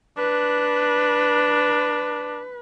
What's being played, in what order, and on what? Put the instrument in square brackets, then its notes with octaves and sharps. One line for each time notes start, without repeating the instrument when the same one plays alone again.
[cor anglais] D4 [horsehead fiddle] B4